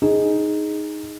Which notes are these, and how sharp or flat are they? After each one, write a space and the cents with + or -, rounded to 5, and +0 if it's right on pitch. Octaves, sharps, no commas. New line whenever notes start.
D#4 +0 G#4 +0